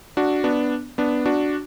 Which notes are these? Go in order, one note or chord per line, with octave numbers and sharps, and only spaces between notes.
D4 F#4
B3 D4
B3 D4
D4 F#4